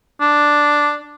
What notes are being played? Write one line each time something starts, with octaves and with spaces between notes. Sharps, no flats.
D4